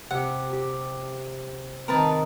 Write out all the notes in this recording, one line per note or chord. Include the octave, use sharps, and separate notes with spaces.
C3 G4 F#5
G4
D#3 C4 A#4 B4 A5